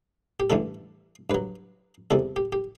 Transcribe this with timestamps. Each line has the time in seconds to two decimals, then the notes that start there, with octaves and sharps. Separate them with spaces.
0.40 G4
0.50 A1 G2 E3 G3 A4
1.30 G2 F#3 B4
2.11 E2 C3 G3 A4
2.36 G4
2.53 G4